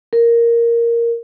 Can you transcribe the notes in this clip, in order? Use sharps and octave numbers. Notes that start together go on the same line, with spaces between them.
A#4